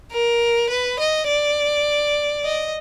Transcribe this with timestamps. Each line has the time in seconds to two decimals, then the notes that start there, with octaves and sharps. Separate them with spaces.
0.11 A#4
0.70 B4
0.99 D#5
1.28 D5
2.45 D#5